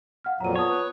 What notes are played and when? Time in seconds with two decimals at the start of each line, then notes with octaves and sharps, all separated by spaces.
0.24 F5 F#5 F6
0.40 F2 A#2 F#3 A#5 D#7
0.56 B3 F4 C#5 A5 D#6
0.70 B4